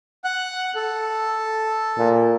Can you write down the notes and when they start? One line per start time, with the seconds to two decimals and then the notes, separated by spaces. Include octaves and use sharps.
0.24 F#5 F#6
0.75 A4
1.98 A#2